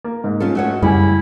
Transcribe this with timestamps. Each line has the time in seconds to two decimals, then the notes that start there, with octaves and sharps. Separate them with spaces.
0.04 A#3
0.24 G#2
0.40 C#4 F4 A4
0.55 A3 F#4 C#5
0.82 F#2 C#3 G3 E4 G4 G#5